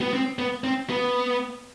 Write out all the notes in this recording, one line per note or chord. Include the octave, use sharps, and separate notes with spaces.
B3
C4
B3
C4
B3